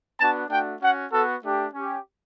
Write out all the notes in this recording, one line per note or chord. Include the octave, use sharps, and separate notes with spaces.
B3 D4 F#4 A5
A3 D4 F#4 G5
C#4 F#4 F#5
B3 F#4 A4
A3 D4 G4
C#4 G4